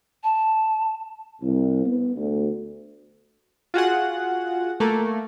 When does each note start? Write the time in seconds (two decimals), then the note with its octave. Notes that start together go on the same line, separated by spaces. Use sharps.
0.24 A5
1.42 C2
1.85 B3
2.16 D2
3.74 F4 F#4 G#4 F#5
4.80 A3 A#3